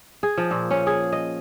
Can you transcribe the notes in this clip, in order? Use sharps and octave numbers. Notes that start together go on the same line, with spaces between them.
G#4
F3
A#2
C#4
G#4
D#5